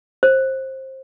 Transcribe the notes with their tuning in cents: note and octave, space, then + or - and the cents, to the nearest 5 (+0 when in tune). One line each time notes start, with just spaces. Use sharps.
C5 +20